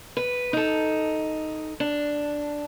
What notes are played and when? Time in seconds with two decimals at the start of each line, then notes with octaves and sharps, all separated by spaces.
0.17 B4
0.53 D#4 A4
1.80 D4